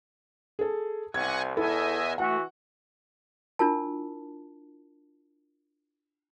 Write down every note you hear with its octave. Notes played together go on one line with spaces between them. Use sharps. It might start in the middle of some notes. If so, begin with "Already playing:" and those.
G#4 A4
C2 F#5 G#5 C#6 G#6
E2 E4 A4 D#5 E5 G#5
E3 A3 F#4 F#5
D4 E4 F4 A#4 A5